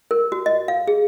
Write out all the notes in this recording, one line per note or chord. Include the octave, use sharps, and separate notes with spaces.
A#4
F#4
D#5
F5
G#4